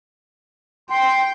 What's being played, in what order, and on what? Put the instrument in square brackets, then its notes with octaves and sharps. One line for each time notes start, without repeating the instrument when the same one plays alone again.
[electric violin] G5 [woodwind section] C6